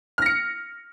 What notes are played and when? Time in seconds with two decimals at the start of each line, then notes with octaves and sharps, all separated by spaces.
0.18 F6
0.22 A#6
0.26 C#7